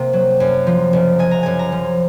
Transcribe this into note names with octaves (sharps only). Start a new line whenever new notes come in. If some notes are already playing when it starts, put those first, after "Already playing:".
Already playing: C3 A#3
F#3
F#2
F3
F#1
G#3 G#5
A#5
F#2 G#5
A#5
F3